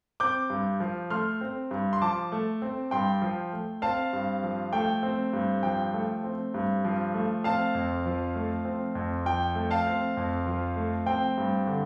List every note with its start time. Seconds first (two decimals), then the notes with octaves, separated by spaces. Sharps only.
0.20 C4 D6 G6
0.50 G2
0.80 F3
1.10 A3 C6 F6
1.41 C4
1.71 G2
1.93 C6
2.01 F3 A5 D6
2.32 A3
2.62 C4
2.91 G2 G5 C6
3.22 F3
3.53 A3
3.82 C4 F5 A5
4.13 G2
4.43 F3
4.73 A3 G5
5.03 C4
5.33 G2
5.63 F3 G5
5.94 A3
6.24 C4
6.54 G2
6.85 F3
7.14 A3
7.44 C4 F5 A5
7.75 F2
8.06 F3
8.35 A3
8.65 C4
8.95 F2
9.25 F3 G5
9.55 A3
9.71 F5 A5
9.87 C4
10.17 F2
10.46 F3
10.76 A3
11.06 C4 G5
11.37 G2
11.67 D3